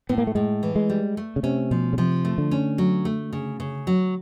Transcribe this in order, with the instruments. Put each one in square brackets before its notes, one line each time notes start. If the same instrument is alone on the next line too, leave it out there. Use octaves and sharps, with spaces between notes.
[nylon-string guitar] A2 [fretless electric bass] B3
[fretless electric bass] A#3
A3
[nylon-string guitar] A2 [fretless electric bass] G#3
[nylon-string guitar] E3
[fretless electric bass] G#3
[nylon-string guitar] G3
A3
[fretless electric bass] C#3
[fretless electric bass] C3 [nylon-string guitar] C#4
[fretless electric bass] B2 [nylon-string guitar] F3
[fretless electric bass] C#3
[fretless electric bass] C3 [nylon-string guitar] F3
[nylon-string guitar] A3
[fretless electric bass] D3
[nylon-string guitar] C#4
F#3
A3
C#3
C#3
F#3